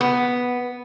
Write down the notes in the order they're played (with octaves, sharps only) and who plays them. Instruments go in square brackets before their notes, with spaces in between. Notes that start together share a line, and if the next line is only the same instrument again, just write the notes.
[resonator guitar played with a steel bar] B3